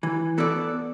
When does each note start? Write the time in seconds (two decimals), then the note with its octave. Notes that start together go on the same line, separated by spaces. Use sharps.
0.03 E3
0.38 B3 F#4 A4 D5